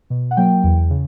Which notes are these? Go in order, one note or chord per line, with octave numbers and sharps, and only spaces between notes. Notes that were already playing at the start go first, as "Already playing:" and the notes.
B2
F#5
F#3 A#3 G5
E2
C#3